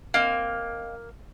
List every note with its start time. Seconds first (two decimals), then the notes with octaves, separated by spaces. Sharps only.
0.14 A#3 C4 D#5 F5